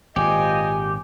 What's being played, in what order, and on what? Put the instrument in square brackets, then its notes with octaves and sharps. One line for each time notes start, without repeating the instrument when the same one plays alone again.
[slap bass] G#1 A#2 [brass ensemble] F4 C5 D#5 [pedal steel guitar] G4 [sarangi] G#5